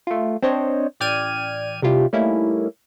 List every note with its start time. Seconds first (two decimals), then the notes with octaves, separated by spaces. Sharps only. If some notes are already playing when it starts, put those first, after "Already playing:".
0.07 A3 F4
0.42 C4 D4 C5 C#5 D#5
1.00 A1 D5 G5 F6 G#6 D#7
1.82 C3 G3 E4 F4 G4
2.13 G3 A3 A#3 C#4 D#4 E4